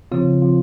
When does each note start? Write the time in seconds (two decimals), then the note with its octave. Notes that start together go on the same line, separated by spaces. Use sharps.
0.12 C#3 F3 C4 F4
0.42 F3 C4 F4